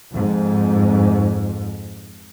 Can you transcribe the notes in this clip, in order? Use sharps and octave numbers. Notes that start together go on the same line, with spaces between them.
F2 G#2